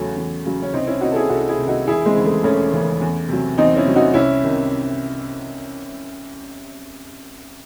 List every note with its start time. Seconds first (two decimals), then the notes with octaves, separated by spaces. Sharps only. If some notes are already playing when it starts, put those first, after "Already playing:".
Already playing: E2 C#3 F#3 A3 C#4
0.17 E2
0.45 C#3 F#3
0.62 C#4
0.73 C2 C4 D#4
0.87 C#4 E4
1.01 C3 D#3 D#4 F#4
1.12 A4
1.15 E4 G#4
1.29 C2 F#4 A4
1.49 E4 G#4
1.58 C3 D#3
1.67 D#4 F#4
1.87 E1 E4 G#4
2.06 G#3 C4
2.15 D#2 C#3 E3
2.25 A3
2.43 E1 A3 C#4
2.72 D#2 C#3 E3
3.01 E2
3.29 C3 F#3
3.58 E2 C4 D#4
3.76 C#4 E4
3.86 C3 F#3
3.96 D#4 F#4
4.14 C2 C#4 E4
4.43 C3 D#3